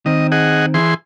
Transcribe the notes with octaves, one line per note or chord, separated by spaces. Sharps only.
D#3 C4 D#5
G#4 D#5 F#5
E3 G#4 C6